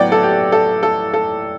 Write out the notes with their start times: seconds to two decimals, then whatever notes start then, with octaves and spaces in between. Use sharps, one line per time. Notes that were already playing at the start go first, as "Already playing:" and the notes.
Already playing: A2 F#3 B3 D5 F#5 G5
0.12 A4
0.23 G4
0.52 A4
0.83 A4
1.13 A4